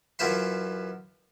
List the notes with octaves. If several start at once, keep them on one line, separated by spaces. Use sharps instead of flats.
F#2 E3 F4 C5 E5 C6